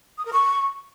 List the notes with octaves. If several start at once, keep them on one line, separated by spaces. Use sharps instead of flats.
D#6
A#4
C#6